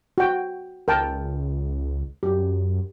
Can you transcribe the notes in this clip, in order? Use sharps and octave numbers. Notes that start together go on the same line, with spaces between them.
F#4 G5
C#2 A#4 G5 A5
F#2 G4